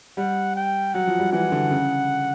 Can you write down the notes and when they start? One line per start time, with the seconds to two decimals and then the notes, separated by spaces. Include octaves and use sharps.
0.17 G3 F#5
0.56 G5
0.94 F#3 F#5
1.07 F3
1.19 G3
1.33 E3 F#5
1.52 D3
1.71 C#3